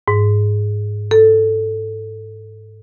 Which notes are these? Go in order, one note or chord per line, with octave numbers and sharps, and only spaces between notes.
G#2
A4